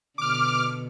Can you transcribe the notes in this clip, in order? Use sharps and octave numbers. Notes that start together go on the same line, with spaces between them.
B2 D3 D6 F6